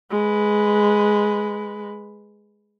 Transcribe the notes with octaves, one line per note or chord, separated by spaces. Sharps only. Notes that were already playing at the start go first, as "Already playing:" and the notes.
G#3 B4